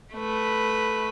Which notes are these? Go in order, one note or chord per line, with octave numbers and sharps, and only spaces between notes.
A3 B4